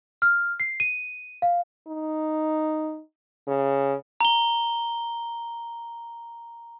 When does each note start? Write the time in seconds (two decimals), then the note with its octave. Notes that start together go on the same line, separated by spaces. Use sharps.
0.22 F6
0.60 C7
0.80 D#7
1.42 F5
1.87 D#4
3.47 C#3
4.21 A#5 G7